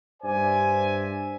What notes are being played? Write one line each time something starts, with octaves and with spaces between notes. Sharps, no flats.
G2 C5 D5 E5 G#5